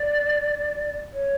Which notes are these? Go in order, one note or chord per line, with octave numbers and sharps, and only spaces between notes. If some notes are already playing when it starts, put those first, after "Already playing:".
Already playing: D5
C#5